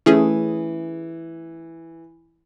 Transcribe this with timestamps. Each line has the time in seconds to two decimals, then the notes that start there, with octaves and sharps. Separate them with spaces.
0.06 E3 A3 C#4 G#4